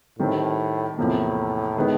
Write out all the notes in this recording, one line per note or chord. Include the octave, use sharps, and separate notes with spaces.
A2 D#3 G3 C4
E2 A2 C3 F3 A#3
D#3 G#3 B3